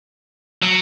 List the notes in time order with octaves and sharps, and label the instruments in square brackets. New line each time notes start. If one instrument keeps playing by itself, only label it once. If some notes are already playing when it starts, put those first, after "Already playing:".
[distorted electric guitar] F#3